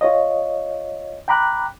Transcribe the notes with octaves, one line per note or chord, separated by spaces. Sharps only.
F4 C#5 D#5
G5 A#5 B5 D6 F#6